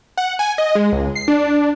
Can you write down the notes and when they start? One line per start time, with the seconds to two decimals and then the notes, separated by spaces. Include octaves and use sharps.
0.18 F#5
0.39 G#5
0.58 D#5
0.75 G#3
0.92 C#2
1.15 C7
1.28 D4